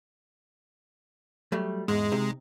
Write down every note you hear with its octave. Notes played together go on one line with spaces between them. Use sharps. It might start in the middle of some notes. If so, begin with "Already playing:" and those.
F#3 G3 A3
E2 G#2 G#3
C3 D#4